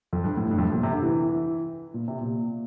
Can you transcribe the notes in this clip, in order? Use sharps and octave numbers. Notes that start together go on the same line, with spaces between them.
F2
G2
A2
G2
F2
G2
A#2
C3
D3
E3
A#2
C3
A#2